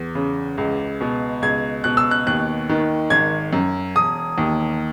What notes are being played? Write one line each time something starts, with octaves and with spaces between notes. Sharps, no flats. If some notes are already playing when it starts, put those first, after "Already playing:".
Already playing: E2
C#3
C#2
B2
C#2 G#6
B2 F#6
E6
F#6
D#2 F#6
D#3
G#1 G#6
F#2
E1 D#6
D#2